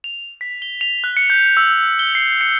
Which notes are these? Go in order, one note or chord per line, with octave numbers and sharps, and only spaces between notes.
F7
B6
G7
F7
F#6
C#7
G6
E6
G7
C7
C#7